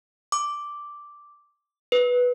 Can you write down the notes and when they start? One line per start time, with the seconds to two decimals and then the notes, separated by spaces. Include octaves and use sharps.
0.32 D6
1.92 B4